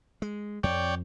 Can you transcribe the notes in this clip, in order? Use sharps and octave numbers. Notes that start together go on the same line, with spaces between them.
G#3
F2 C#5 D5 G5